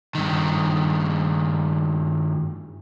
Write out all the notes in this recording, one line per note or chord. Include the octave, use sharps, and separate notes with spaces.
G2 D#3